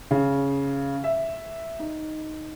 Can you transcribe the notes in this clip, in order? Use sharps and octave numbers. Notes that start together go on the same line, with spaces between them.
C#3
E5
D#4